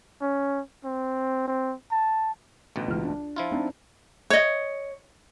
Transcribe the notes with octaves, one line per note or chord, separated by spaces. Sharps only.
C#4
C4
C4
A5
A1 D2 B2
C#2 E3 F6
D4
F3 E4 F4
C4 D4 D#4
C#5 D#5